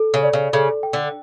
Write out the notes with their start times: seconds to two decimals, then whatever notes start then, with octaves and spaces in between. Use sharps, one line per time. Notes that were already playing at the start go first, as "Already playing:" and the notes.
Already playing: A4
0.14 C#3
0.23 D5
0.33 C#3
0.53 C#3 A4
0.83 G5
0.93 D3